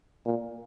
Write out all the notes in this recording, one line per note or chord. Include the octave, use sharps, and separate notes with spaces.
A#2